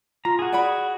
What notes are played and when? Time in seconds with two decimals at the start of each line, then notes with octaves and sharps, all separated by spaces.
0.25 F4 A#5
0.39 F#4 G#4
0.52 D5 F#5 B5